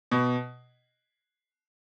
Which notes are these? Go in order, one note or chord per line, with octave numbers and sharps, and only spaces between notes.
B2